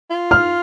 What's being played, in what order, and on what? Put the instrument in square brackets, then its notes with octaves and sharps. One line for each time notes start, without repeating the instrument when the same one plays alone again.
[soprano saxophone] F4
[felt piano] F6